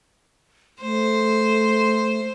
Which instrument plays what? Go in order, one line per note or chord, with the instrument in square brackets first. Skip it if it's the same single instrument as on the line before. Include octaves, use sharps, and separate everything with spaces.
[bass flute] A3 [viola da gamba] C5